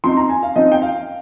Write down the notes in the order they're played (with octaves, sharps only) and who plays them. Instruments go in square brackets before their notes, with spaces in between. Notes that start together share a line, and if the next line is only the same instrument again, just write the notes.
[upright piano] F3 C4 D#4 C6
A#5
G#5
F5
F3 C4 D#4 D#5
G5
F5